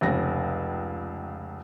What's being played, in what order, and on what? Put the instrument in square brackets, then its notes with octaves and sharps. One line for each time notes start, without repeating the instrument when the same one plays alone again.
[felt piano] F1 C#2 A#6